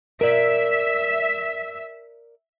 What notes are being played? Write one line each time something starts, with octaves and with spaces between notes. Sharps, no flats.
A#4 D5 E5